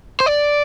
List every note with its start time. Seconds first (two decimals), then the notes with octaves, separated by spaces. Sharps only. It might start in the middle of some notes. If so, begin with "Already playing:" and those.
0.20 C5
0.26 D5